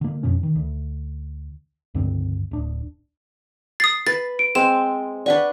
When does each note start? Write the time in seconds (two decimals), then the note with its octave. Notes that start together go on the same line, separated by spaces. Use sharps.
0.01 D3 A#3
0.23 F2 B2 C#4
0.43 D#3
0.56 D2
1.95 C#2 G2 D3 C4
2.51 D1 D4
3.80 D#6 A6 C7
4.07 B4 A6
4.39 D7
4.55 G#3 C4 E7
5.26 D4 B4 D5 F#5 C#6